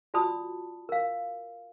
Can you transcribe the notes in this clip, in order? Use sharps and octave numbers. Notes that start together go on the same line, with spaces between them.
F4 F#4 D5 A5 B5 D#6
A#4 F5